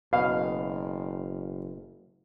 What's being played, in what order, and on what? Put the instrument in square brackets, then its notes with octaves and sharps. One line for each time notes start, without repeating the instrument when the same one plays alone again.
[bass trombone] F#1 [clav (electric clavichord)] B2 [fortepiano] F5